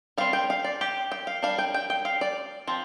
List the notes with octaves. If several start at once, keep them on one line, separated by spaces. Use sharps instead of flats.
G3 C4 F5
G5
F5
D5
G4
G5
F5
G3 D4 F5
G5
G5
G5
F5
D5
F3 C4